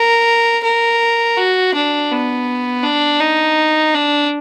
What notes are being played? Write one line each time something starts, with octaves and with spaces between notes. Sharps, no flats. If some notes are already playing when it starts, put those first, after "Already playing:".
Already playing: A#4
A#4
F#4
D4
B3
D4
D#4
D4